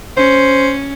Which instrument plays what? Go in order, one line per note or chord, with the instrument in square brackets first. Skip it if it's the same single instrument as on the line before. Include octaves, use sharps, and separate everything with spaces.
[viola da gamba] C#4 [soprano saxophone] C5